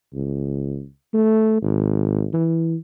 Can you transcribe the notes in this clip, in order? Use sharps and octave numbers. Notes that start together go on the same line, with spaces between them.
C#2
A3
G#1
E3